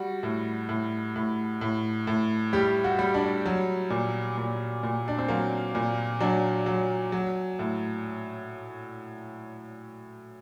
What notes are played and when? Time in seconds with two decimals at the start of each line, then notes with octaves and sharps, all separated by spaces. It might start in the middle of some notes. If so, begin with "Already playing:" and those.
Already playing: G3 F#4
0.23 A2
0.69 A2
1.16 A2
1.61 A2
2.07 A2
2.53 G3 G4
2.84 F#4
2.99 G3
3.14 D4
3.45 F#3
3.90 A#2
4.37 A#2
4.83 A#2
5.08 D4
5.18 C4
5.28 F#3 A#3
5.75 A#2
6.20 F#3 D4
6.66 F#3
7.12 F#3
7.59 A2